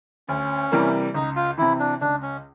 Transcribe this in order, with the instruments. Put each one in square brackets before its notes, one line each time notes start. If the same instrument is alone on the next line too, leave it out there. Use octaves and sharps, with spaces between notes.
[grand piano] D2 [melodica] C#4
[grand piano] C3 E3 G3 A#3
[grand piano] C#2 [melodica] D#4
[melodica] F4
[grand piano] C3 E3 [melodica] E4
[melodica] D4
[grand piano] C#2 [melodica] D4
[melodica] C#4